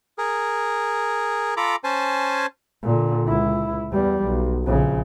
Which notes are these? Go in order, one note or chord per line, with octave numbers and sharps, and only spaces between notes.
G#4 A#4
F4 A4 A#5 B5 D6
C#4 C5 G#5 A5
A#2 D3
C#2 E4
E2 G3
B1
A#1 C#3